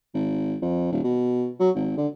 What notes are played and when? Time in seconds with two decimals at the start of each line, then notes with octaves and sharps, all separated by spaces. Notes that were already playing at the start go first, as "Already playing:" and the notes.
0.14 G#1
0.62 F2
0.92 D#1
1.04 B2
1.60 F#3
1.76 G#1
1.97 D3